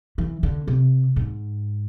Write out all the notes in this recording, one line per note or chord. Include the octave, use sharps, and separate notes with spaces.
E3
D3
C3
G#2